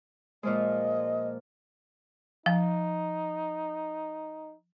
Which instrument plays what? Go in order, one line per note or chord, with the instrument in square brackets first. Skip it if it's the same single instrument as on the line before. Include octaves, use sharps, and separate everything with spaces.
[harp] A#2 F3 G#3 [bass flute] D#5
[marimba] F3 [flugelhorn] D#4